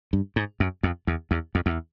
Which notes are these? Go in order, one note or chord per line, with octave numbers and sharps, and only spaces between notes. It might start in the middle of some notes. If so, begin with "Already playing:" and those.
G2
G#2
F#2
F2
E2
E2
F2
E2